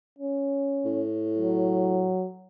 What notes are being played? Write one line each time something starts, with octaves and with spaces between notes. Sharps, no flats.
C#4
A2
F#3